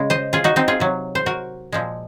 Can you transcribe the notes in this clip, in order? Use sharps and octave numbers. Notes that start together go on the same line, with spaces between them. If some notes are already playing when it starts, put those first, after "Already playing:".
Already playing: C#3 G#3
C5 D#5
F4 G#4
D#4 F#4
C4 D#4
F4 G#4
C3 F#3
C5
F#4 A#4
A#2 F3 G#3